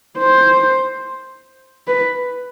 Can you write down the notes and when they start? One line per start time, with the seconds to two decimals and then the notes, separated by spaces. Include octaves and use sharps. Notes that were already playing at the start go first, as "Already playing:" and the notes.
0.18 C5
1.88 B4